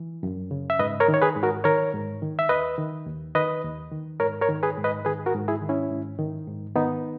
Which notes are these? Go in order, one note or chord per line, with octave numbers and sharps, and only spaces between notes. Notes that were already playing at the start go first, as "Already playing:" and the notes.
Already playing: E3
F#2
C#3
E5
G#2 B4 D#5
A#4 C#5
D#3
C#5
G#4 B4
G#2
F#4 A#4
D#3 A#4 C#5
G#2
D#3
E5
D#2 B4 D#5
D#3
D#2
D#3 B4 D#5
D#2
D#3
G#2 A#4 C#5
A#4 C#5
D#3
G#4 B4
G#2
B4 D#5
D#3 G#4 B4
F#4 A#4
G#2
E4 G#4
D#3
C#4 E4
G#2
D#3
G#2
D#3 B3 D#4